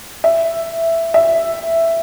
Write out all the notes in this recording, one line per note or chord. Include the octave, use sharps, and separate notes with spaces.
E5
E5